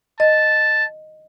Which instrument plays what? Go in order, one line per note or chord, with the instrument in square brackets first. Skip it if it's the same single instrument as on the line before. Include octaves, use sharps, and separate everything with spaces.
[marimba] D#5 [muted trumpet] A5